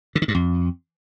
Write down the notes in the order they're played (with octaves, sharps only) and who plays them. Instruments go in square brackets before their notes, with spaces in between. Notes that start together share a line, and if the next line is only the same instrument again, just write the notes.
[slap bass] D3
D#3
G2
F2